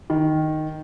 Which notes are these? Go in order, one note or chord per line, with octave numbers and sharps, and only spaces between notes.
D#3